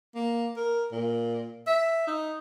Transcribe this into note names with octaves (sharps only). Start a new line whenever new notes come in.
A#3
A#4
A#2
E5
D#4